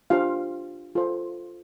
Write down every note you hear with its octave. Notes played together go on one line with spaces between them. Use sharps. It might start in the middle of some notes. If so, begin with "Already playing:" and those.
D4 F4 G4 C5 F5
F4 A4 C5